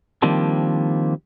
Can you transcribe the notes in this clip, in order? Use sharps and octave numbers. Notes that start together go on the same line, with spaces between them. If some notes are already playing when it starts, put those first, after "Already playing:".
D#3 F3 G3 A#3 C4 D4